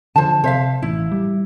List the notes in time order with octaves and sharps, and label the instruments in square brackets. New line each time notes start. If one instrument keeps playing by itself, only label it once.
[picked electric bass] D3 F3 [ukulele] C5 A5
[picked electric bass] C3 [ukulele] C5 E5 F5
[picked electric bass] A1 [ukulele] E4
[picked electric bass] G3